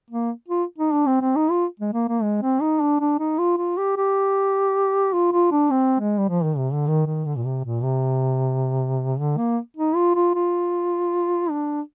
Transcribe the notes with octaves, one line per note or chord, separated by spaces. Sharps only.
A#3
F4
D#4
D4
C4
C4
D#4
F4
G#3
A#3
A#3
G#3
C4
D#4
D4
D4
D#4
F4
F4
G4
G4
F4
F4
D4
C4
G#3
G3
F3
D#3
C3
D3
D#3
D#3
D3
A#2
C3
A#2
C3
D3
A#3
D#4
F4
F4
F4
D4